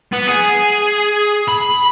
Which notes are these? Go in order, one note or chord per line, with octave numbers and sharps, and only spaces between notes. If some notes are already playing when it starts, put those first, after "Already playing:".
B3
G#4
B5